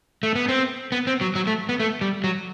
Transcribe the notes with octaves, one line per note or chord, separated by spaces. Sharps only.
A3
B3
C4
B3
C4
F#3
F#3
A3
B3
A3
G3
F#3